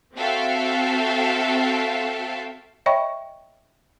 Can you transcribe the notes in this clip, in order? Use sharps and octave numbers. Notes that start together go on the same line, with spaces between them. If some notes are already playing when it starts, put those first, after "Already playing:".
C4 F#4 A4 E5 F5 G5
C#5 D#5 E5 G5 B5 C#6